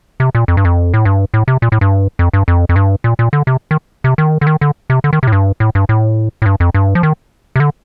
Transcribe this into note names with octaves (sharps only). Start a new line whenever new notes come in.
C3
A#2
F2
G2
F2
A2
G2
A2
C3
A#2
A2
G2
F2
G2
F2
F2
G2
A#2
A#2
D3
C3
D#3
C3
D#3
D3
D#3
D3
C3
D3
D#3
C3
A2
G2
A2
G2
A2
A2
G2
F2
G2
F3
D#3
C3
D3